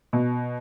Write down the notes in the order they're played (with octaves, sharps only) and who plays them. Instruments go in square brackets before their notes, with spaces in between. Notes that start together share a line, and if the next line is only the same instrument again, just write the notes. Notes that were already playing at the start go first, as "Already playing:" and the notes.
[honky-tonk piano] B2